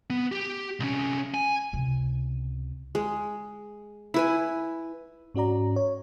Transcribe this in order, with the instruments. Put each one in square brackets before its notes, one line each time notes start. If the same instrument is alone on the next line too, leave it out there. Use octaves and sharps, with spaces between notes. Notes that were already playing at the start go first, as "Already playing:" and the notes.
[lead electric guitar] B3
G4
C2 C#4
G#5
[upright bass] C#2 C3
[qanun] G#3
E4 B4 G#5
[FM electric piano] G#2 C#4 F#4 D5 A#5
C#5